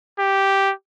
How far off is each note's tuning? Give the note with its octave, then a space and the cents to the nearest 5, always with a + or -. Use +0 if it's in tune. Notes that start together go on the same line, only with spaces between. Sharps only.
G4 -5